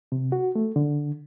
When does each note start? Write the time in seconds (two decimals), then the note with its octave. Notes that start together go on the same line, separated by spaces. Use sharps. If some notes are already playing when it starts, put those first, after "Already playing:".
0.12 C3
0.32 F#4
0.55 A3
0.76 D3